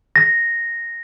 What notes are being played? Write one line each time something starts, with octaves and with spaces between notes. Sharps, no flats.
A#6